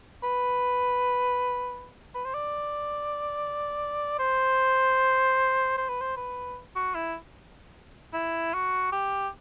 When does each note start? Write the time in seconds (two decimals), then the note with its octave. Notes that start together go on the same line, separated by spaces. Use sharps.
0.23 B4
2.15 B4
2.25 C5
2.34 D5
4.19 C5
5.77 C5
5.88 B4
6.01 C5
6.17 B4
6.75 F#4
6.95 E4
8.13 E4
8.54 F#4
8.92 G4